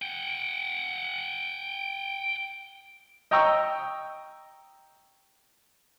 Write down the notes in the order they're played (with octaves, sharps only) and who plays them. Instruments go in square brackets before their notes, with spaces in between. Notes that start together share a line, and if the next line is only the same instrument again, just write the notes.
[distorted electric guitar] F#5 G5
[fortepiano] D#5 G5 A#5 C#6 E6